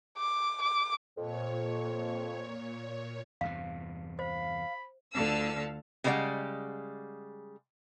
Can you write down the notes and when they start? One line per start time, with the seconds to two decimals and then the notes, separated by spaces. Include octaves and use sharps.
0.17 D6
0.63 D6
1.17 F2 A#2 C#5
3.41 E2 G2 C3 F5
4.19 C5 F5 B5
5.13 D2 D3 F4 F5 A5 E6
6.04 C#3 G3 G#3 D4 D5 F#5